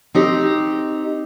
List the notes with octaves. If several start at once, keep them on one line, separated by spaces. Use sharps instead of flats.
C4 D#4 G4